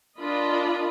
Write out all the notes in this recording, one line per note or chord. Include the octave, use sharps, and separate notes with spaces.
D4 F4 A#4 D#5 B5